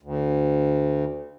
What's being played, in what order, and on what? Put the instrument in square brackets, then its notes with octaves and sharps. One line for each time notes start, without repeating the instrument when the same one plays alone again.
[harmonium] D2